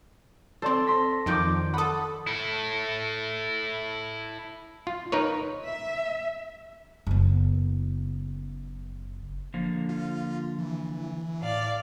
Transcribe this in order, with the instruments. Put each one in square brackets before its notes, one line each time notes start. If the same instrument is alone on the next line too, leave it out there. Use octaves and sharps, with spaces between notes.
[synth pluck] C4 C5 [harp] A4 D5 C6
[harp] C6 A#6 B6
[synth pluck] F2 D#3 F3 [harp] D6 G6 D7
[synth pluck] A4 F#5 [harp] B5 D#6
[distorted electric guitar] E4 A4
[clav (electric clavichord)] F4
D#4 A#4 B4 C#5
[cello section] E5
[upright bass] F#1 B3
[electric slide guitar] D3 F3 A#3
[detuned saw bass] F4
E3
[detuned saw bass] A2 [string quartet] D5 F5